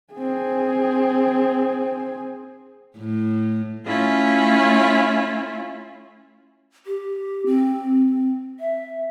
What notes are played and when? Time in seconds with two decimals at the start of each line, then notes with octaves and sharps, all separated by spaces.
0.14 C4 G#4
2.98 A2
3.85 A3 C#4 E4 F4
6.86 G4
7.46 C4
8.60 E5